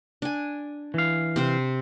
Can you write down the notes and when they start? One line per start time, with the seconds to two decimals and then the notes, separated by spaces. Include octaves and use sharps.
0.22 D4 G#5
0.94 E3 F5
1.36 C3 C4 C5